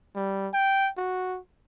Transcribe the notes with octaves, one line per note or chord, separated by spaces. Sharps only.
G3
G5
F#4